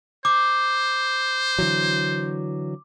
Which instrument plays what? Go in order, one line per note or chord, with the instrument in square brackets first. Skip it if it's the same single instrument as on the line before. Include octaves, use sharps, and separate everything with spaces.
[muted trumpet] C5 [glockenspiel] D6
[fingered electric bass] D3 E3 F#3